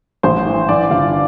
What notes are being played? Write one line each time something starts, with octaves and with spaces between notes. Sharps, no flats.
A1 C5
E3
E3 D5
G1 F5